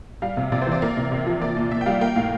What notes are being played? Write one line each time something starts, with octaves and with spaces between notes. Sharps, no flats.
G3 F5
C3
C3 D5
C5
E3 D5
A#3
C3
C3
F3
A#3 D5
A#2
A#2 E5
G5
G3 F5
A#3 G5
A2 F5